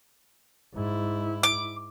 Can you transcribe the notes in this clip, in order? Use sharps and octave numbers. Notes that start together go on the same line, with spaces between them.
G#2 E4
D6